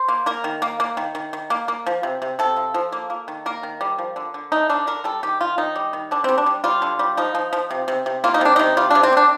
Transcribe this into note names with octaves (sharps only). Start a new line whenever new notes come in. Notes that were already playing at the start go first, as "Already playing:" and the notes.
Already playing: C5
A#3
A#3 A#4
D#3
A#3
A#3
D#3
D#3
D#3
A#3
A#3
F3
C3
C3
C3 A4
F3
F3
A#3
A#3
D#3
A#3 A#4
D#3
G3
F3
D3
D3
A3 D#4
D3 D4
D3 A#4
G3 A4
D#3 G4
D#3 F4
D#3 D#4
G3
D#3
D3 D4
G3 C4
D4
G3
G3 F4
D3
G3
F3 D#4
F3
F3
C3
C3
C3
A#3 F4
D#4
C3 D4
C3 D#4
G3 F4
C3 D4
C4
C3 D4